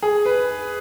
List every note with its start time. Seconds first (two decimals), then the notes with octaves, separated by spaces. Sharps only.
0.02 G#4
0.25 B4